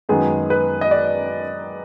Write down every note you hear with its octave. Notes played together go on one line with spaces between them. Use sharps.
F#2 D#3 G#3 B3 D#4 G#4
B4
D#5
D5